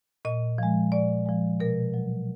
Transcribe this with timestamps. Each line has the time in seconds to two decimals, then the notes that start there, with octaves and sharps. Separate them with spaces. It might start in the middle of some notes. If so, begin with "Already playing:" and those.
0.25 A#2 D#5
0.58 F3 G#3
0.92 A#2 D5
1.26 F3 G#3
1.60 B2 A#4
1.94 F#3